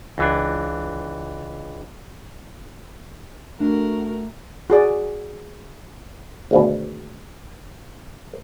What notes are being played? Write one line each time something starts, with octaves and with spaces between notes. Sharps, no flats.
C#2 E3 D4
A3 D4 F#4 A#4
F#4 G#4 D5
G#1 D2 B2